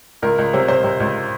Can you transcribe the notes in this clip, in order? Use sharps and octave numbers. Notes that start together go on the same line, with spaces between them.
C#2 A#4
C#2
C3 C5
C3 C5
C3
C#2